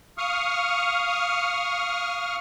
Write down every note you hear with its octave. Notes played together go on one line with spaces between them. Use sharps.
F5 C#6 D#6 F6